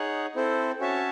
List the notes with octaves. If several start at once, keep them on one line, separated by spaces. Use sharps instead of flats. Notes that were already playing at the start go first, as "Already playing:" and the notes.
Already playing: D#4 G#4 C#5 F#5
C4 E4 A4 C5
C#4 F#4 C#5 E5 A5